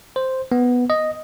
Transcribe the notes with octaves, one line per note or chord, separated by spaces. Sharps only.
C5
B3
D#5